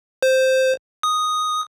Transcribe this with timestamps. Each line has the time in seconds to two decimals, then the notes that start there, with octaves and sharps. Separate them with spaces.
0.23 C5
1.03 D#6